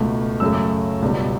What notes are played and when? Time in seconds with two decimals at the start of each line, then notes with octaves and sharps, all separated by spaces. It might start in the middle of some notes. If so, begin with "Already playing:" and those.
Already playing: C#2 B2 A3
0.40 F#2 C#3 F#3 A3 E6
1.02 C#2 B2 G3 B3